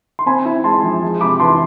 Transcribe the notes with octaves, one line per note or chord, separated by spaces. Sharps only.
C6
C4 G#5 B5
E4
G#3 A5 C6
F3
G#3
C3 B5 D6
E3 A5 C6